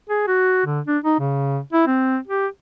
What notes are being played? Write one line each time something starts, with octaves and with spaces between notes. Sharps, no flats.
G#4
F#4
D3
D4
D#4
C#3
E4
C4
G4